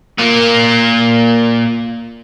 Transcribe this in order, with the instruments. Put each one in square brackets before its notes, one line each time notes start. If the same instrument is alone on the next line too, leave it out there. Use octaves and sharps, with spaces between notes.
[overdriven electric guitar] A#2 A#3